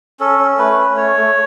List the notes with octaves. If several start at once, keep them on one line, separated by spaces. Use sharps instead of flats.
C#4 A4
C#4
A3 B4
C#4
A3 C#5
A3